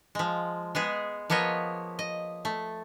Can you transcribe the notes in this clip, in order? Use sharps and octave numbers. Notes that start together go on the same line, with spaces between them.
F3 G#3
G#3 B3 G#4
F3 A#3 B3 C#5 D#5
D#5
A3